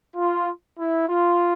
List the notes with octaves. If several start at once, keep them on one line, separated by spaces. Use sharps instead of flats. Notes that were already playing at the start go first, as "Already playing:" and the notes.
F4
E4
F4